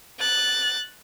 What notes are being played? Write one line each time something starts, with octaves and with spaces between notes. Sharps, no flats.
F#6 A6